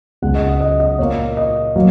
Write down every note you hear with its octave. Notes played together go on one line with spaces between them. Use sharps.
C#2 C#3 G#3 F#5
D#5
D#5
D#5
D#5
A#2 A#3 C#5
D#5
F#3 A#3